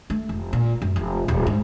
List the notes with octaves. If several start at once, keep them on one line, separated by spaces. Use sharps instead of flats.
A3
F1
A#2
F#2
F1
D1
G#2